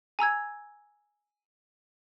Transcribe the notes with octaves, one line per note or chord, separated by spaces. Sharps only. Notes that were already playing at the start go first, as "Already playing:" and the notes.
G#5 A#5 E6 G#6